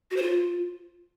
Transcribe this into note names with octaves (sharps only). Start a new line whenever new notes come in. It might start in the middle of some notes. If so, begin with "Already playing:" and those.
F#4
C5
F4